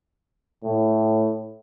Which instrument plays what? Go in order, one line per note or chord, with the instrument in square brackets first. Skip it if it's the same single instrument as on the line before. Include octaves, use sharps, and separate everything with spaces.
[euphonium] A2